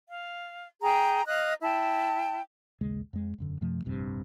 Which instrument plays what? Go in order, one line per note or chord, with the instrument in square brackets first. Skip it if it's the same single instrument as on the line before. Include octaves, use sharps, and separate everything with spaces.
[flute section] F5
G#4 G5 A#5
D#5 F5 F#6
E4 G5 A5
[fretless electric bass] A#1 D#2 C#3 G#3
F2 G#3
E1 F#2 D3
F#2 C3 F3 A3
F1 A#1 G2 C3